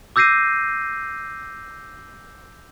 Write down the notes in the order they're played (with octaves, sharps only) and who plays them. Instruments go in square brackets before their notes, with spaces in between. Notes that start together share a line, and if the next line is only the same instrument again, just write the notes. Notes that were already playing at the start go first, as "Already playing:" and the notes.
[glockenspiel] D6 E6 G6 A#6 C7 D#7